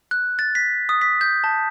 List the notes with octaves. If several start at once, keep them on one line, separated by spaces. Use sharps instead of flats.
F#6
A6
B6
D#6
B6
G6
A5